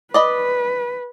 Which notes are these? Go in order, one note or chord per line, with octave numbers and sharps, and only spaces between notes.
B4 D5 D#5 B5